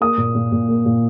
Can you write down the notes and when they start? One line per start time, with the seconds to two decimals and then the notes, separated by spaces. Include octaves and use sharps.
0.01 A#3 D#6
0.18 A#2
0.35 A#2
0.52 A#2
0.69 A#3
0.86 A#2